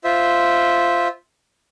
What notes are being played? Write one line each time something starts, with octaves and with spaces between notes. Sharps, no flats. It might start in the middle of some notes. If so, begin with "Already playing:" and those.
F4 C5 E5